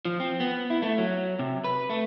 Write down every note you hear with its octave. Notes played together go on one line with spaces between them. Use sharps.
F3
C4
B3
E4
A3
F#3
C3
B4
A3